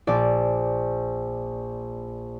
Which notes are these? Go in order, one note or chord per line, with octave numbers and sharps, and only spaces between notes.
A#1 D5 D6